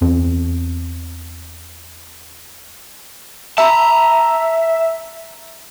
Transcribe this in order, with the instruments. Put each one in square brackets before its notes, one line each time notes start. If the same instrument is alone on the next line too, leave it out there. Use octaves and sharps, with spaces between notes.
[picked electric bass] E2 C4
[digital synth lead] E5 [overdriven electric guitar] A5 A#5